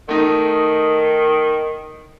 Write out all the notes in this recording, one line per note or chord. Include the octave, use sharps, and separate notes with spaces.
D#3 A3 D#4